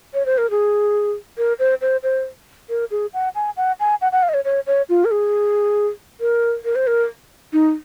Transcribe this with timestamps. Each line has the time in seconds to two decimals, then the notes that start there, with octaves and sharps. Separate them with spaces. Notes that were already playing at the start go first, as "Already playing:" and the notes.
0.14 C#5
0.26 C5
0.38 A#4
0.50 G#4
1.38 A#4
1.59 C5
1.81 C5
2.03 C5
2.69 A#4
2.91 G#4
3.14 F#5
3.35 G#5
3.57 F#5
3.80 G#5
4.01 F#5
4.12 F#5
4.23 F5
4.29 D#5
4.34 C#5
4.45 C#5
4.67 C#5
4.89 F4
5.05 A#4
5.11 G#4
6.21 A#4
6.65 A#4
6.75 C5
6.87 A#4
7.53 D#4